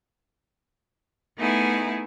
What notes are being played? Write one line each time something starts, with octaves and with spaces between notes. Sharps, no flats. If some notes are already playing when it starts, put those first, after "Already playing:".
A3 B3 D#4 E4 G#4